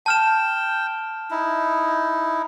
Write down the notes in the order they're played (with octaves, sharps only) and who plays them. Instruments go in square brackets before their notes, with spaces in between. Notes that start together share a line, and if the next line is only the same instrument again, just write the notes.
[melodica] G5 [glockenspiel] A5 F6 E7
[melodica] D#4 E4